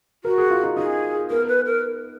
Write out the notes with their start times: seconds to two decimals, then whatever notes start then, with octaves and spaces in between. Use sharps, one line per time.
0.24 F#4 A#4
0.38 G#4
0.51 F4
0.63 D#4
0.77 D#4 G#4
1.29 B3 A#4
1.48 B4
1.65 A#4